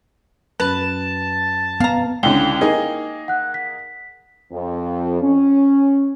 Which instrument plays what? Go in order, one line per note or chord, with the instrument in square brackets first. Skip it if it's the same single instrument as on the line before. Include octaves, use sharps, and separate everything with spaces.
[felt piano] F#2 [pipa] B4 [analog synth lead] A5
[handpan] B3 [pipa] F5 A#5
[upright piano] C#2 D3 C#4 [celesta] E4 G5 G7
[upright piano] A#3 D#4 G#4
[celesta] F#5 F#6
B6
[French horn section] F2
C#4